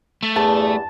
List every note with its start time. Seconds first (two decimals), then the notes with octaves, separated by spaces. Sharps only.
0.23 A3
0.36 E2 G2 A5